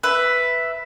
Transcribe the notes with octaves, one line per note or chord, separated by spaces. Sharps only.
B4 E5